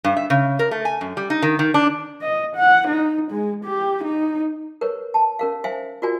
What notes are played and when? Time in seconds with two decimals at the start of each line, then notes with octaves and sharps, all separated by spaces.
0.04 G2
0.17 E5
0.30 C#3
0.59 A#4
0.71 A3
0.85 G#5
1.01 F#2
1.17 G3
1.30 D#4
1.42 D#3
1.59 D#3
1.74 D4
2.22 D#5
2.56 F#5
2.88 D#4
3.31 G#3
3.65 G4
4.04 D#4
4.81 A#4 B4 C#5
5.14 A5
5.39 C#4 A#4 F5
5.64 C5 E5 F5 G#5
6.02 F4 F#4 A#4 D5 G#5